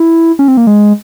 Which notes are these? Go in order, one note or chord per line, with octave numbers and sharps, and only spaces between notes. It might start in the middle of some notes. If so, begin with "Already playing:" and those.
Already playing: E4
C#4
C4
A#3
G#3